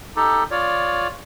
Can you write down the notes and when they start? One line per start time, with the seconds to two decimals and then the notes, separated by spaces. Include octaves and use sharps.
0.16 D#4 G4 A4
0.51 F4 C#5 D5